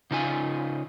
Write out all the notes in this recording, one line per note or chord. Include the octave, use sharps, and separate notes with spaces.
C#3 D#4 F4 G#5